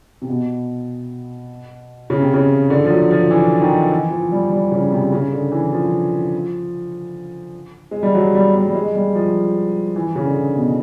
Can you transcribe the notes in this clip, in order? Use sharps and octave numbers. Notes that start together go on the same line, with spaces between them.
C3
B2
C#3
C3
C#3
D3
F3
F#3
F3
E3
D#3
E3
F3
G3
G3
C#3
C3
C#3
D3
E3
F3
G#3
G3
F#3
G3
G3
G3
G#3
G3
F3
E3
C#3
D3
B2